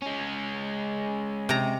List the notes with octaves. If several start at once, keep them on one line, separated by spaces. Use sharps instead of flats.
G#3 C#4
C3 A#5